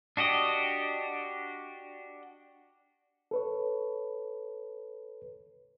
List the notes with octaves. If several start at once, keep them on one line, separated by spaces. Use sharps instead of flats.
D4 F#4 G4 D#5
A4 B4 C#5